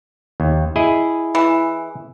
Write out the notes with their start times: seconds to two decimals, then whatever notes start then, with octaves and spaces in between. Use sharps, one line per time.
0.40 D#2
0.76 E4 G#4 D#5
1.35 E3